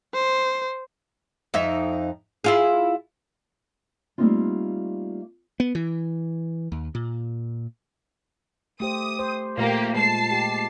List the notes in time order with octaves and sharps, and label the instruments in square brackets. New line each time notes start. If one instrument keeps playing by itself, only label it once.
[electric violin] C5
[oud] F2 D#4 E5
E4 F4 G#4
[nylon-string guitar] G3 A3 A#3 C4 D#4 F4
[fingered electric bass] B3
E3
D#2
A#2
[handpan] A3 G4 C5 [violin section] D#6
[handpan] C5
[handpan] A#2 A3 [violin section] A#3 G4
[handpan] G#3 [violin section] A5 C7
[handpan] G4